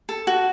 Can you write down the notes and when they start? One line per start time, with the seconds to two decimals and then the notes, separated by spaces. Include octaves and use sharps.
0.09 A4
0.27 F#4